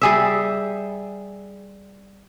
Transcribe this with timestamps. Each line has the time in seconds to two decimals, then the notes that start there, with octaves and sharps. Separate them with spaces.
0.02 G3 G#4 E5